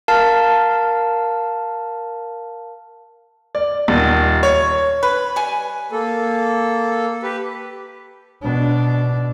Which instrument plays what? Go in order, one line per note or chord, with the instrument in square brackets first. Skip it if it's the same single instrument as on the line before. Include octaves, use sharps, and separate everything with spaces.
[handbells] A#4 F5 A5
[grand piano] D5
D#1
C#5
[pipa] B4
G3 G#5
[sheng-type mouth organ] A#3 A4
G4 B4
[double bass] B2 D4